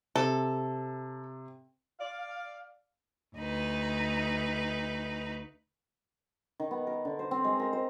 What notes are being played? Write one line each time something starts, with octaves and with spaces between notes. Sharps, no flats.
C3 A4
D5 F5
D2 D#4 B4
D#3
B3
A#4
D3
C5
C4
G#3
A#4
C5